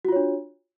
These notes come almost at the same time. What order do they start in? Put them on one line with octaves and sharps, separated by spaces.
F#4 F4 C#5 D4